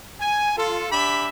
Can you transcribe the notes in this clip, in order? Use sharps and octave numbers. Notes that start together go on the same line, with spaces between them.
G#5
F4 A4
D4 G4 E5 B5